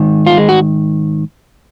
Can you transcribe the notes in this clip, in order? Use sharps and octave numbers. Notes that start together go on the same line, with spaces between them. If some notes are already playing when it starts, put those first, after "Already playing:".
Already playing: G#2 D#3
F4
G#3
F#4